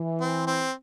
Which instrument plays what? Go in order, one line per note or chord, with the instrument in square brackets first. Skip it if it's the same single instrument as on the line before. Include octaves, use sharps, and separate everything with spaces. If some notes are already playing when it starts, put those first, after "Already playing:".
Already playing: [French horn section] E3
[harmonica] C4
C4